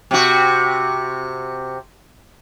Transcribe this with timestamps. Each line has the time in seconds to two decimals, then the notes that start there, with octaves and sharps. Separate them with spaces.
0.11 C3 F#4